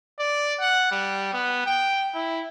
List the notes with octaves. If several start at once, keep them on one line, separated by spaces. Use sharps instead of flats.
D5
F#5
G3
B3
G5
E4